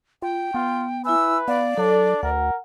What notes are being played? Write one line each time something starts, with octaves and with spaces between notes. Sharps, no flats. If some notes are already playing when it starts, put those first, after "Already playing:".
F4 G5
B3 F4
E4 B4 E5 G#5 E6
B3 D5 F5
F#3 D4 A4
D2 A#4 F#5